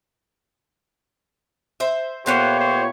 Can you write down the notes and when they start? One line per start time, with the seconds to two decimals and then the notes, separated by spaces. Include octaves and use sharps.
1.80 C5 E5
2.26 A#2 A3 B3 F4 G4 C5 C#5
2.59 C5